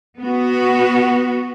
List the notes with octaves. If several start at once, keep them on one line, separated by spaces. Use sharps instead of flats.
B3 F#4